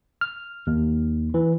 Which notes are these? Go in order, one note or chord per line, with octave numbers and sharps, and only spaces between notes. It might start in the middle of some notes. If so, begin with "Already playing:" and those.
F6
D#2
E3